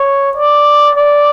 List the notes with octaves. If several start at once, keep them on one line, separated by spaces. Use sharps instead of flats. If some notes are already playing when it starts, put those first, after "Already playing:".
Already playing: C#5
D5
D5